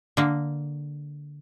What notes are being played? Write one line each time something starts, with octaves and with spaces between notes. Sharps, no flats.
D3 A#3